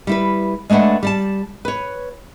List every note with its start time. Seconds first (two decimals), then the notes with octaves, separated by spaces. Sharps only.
0.07 G3 E4 B4
0.70 G#3 A3 D4 B4 F#5
1.03 G3 D5 A5
1.65 B4 C#5